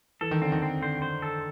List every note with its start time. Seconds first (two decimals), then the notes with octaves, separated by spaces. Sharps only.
0.21 E3 A4
0.31 D#3
0.42 D3 C4
0.52 D#3
0.62 C4
0.82 D3 C5
1.02 C5
1.22 A4